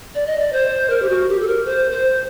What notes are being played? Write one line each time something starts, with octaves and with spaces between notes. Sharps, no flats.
D5
D#5
D5
C5
A#4
G4
F#4
G4
A4
A#4
C5
C5